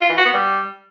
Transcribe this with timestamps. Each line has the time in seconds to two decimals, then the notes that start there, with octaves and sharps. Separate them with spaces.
0.01 F4
0.09 E3
0.17 F#4
0.25 B3
0.33 G3